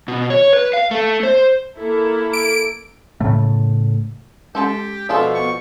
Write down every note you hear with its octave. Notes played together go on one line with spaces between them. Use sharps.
B2
C#5
B4
F5
A3
C5
A#3 E4 A4
D7
A2 C#3 A3
G#3 C#4 G4 A4 A5 C6
B2 F3 D4 F4 A4 E5
B3 C#6